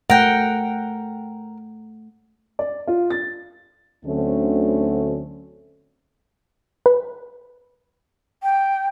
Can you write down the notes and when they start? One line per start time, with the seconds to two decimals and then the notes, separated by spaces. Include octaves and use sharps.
0.10 A3 A#4 F#5 G5
2.59 D5
2.87 F4
3.10 A6
4.06 D2 D3 F#3 A3 C4 C#4
6.86 B4
8.42 G5